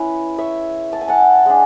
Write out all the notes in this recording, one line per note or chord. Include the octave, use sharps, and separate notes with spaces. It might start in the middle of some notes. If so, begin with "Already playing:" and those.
Already playing: G#3 C#4 E4 B4 E5
C#5 E5
A5
G#5
F#5 A5
G#3 D4